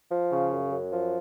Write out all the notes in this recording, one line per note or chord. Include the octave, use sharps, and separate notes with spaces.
F3
C#3
F#2
F#2
F3